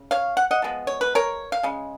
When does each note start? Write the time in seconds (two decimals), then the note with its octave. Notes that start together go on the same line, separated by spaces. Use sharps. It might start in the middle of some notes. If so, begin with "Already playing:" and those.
Already playing: C#3
0.11 C#5 F5
0.37 F#5
0.51 D#5 F#5
0.62 F3 G#3 B3
0.87 C#5
1.01 B4
1.15 A#4 C#5
1.52 F5
1.63 C#3 G#3